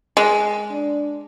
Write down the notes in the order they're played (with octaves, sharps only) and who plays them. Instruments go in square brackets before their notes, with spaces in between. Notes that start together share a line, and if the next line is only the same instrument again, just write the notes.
[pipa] G#3
[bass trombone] D4